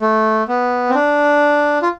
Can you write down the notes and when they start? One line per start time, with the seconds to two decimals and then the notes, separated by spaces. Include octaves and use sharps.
0.01 A3
0.48 B3
0.89 C4
0.95 D4
1.82 F4